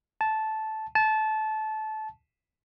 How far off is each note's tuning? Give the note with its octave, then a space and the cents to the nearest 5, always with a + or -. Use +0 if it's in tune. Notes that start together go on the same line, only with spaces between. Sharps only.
A5 -10
A5 -20